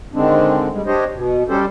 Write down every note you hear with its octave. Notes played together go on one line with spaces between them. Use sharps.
D3 D#3 G#3 C4 D4
G3 G#3
D4 G4 C5 C#5 D#5
B2
G3 C#4 G4 A4 C5